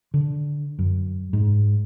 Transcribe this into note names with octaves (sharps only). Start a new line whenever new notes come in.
D3
F#2
G#2